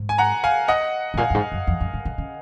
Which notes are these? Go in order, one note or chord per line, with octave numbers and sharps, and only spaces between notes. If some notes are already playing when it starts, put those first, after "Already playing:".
Already playing: G#2
G#5
F#5 A#5
F5 G#5
D#5 F#5
G#2
A#2 F5 G#5
F#2
G#2
F#2
F2
F#2
G#2
C3
C#3